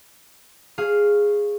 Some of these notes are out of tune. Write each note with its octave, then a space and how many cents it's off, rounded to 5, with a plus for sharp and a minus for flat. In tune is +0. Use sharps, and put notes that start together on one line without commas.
G#4 -5 C#5 -10 F5 +0